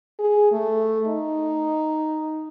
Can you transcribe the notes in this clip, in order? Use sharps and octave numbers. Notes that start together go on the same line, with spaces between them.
G#4
A3
D#4